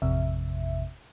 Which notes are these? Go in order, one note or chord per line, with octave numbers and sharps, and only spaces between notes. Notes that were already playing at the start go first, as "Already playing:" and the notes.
A1 F2 C3 E5